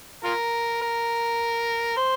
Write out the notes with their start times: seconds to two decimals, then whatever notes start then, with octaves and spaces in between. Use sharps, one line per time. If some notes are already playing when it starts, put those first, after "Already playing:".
0.24 F4 A#4
0.81 A#4
1.97 C5